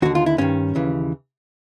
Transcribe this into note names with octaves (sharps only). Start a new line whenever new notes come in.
D#2 D3 F#4
F4
E4
G2 D#3 C#4
D#2 C#3 E3